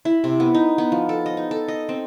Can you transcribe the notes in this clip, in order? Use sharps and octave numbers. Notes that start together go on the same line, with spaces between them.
E4
C3
B3
D#4
B3
F3
A4
D#5
D#4
A4
D#5
C4